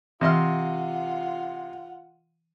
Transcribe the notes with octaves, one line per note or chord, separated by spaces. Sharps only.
C3 E3 F4 D#5 E5 F#5 C6 F6